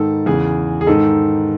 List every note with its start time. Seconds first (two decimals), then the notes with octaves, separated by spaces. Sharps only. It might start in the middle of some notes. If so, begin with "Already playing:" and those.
Already playing: G#2 D#3 A4
0.26 E2 C#3 E3 G#4
0.81 G#4
0.86 G#2 D#3 A4